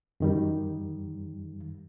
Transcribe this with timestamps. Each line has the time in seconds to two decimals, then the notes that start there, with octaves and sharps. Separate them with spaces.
0.20 F#2 D#3 G3